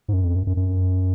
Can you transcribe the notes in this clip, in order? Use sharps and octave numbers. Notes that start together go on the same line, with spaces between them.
G#2
F#2
F2
F#2
F#2
F#2